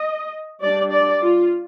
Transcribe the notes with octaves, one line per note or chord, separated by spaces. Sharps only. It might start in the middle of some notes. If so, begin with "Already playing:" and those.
Already playing: D#5
G3 D4 D5
D5
F4